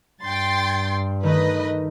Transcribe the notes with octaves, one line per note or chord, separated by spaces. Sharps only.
G2 G5 C6 A6
D#3 A3 B4 D#5